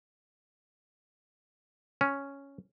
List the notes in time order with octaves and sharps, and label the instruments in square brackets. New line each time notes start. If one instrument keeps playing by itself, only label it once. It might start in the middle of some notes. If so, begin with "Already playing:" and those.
[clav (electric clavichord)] C#4